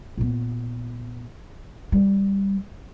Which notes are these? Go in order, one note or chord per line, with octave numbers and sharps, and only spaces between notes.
A#2 B3
G3